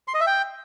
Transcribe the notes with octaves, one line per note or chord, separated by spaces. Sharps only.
C6
D#5
E5
G5